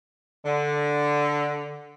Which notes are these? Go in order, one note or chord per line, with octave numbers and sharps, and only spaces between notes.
D3